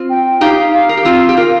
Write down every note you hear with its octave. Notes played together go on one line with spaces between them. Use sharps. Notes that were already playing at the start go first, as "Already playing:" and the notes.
Already playing: C4 F4
G5
D#4 G4 F5
F5
A#4
G4
C4 F4
G4
F4 A#4